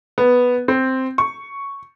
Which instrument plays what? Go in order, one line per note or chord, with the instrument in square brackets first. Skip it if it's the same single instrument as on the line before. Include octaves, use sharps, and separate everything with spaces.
[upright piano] B3
C4
C#6